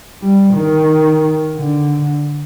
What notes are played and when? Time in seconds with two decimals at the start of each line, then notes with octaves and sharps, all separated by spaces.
0.22 G3
0.54 D#3
1.56 D3